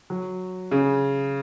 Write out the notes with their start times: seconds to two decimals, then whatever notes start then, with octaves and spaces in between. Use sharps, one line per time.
0.10 F#3
0.71 C#3